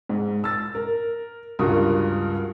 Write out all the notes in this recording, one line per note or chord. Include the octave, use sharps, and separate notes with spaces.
G#2
E6 A6
A#4
C#2 G2 F#4 A#4 D#6